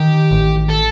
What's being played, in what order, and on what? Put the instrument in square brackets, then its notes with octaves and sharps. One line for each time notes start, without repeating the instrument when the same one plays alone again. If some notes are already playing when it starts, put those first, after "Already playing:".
Already playing: [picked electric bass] D#3 [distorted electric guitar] G4
[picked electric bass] A1
[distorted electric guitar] A4